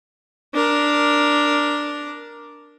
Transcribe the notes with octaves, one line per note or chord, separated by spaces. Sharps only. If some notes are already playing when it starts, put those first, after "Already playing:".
D4 A#4